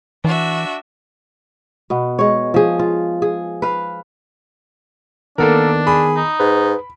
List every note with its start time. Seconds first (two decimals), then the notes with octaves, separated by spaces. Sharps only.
0.25 E3 D4 F#4 E5
1.90 B2 B3
2.19 G#3 C#5
2.54 F3 G#4
2.79 F4
3.22 G#4
3.62 B4 F5
5.38 D#3 A#3 B3 D4 A4 A#4
5.87 G#4 B5
6.16 D#4
6.40 G#2 B4